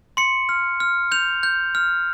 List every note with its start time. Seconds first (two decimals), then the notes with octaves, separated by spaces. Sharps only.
0.17 C6 C#7
0.49 F6
0.80 F6
1.11 G6 F7
1.43 G6
1.75 F6